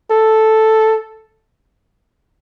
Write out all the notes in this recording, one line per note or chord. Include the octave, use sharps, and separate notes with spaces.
A4